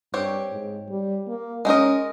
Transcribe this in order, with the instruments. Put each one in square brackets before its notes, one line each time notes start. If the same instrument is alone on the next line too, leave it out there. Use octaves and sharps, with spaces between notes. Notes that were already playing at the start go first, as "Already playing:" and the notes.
[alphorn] G2 [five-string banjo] C4 G4 C#5
[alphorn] G#2
G3
A#3
[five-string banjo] G#3 D#4 A#4 D#5 [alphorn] C#4